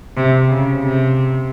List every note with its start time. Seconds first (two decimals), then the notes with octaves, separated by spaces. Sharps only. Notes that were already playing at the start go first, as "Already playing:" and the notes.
0.17 C3
0.50 C#3
0.83 C3